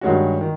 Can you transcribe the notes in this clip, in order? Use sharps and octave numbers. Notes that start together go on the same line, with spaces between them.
G2 D#3 G#3 C#4 F#4
D#3